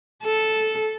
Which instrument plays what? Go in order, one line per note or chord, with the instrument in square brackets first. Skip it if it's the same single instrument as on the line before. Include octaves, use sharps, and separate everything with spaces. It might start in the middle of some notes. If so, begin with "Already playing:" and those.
[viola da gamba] A4